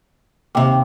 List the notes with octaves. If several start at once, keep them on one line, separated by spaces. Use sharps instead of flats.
D#2 C3 G5 D6